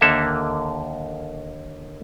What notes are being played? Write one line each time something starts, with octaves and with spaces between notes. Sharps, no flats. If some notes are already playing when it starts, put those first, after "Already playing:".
D#2 D3 A#3 A4 E5